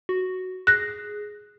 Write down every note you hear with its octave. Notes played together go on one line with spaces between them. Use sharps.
F#4
G#4 F#6 A#6